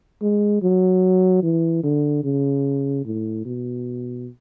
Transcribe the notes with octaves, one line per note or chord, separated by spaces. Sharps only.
G#3
F#3
E3
D3
C#3
A2
B2